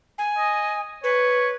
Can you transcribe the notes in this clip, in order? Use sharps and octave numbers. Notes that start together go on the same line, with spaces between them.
G#5
D#5
B4 C#5